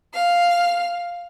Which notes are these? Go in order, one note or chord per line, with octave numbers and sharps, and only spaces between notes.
F5